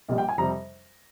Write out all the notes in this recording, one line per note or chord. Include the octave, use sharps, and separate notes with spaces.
A#1 A#2 G3 D#5
G5
G#5
F2 C3 G3 A#5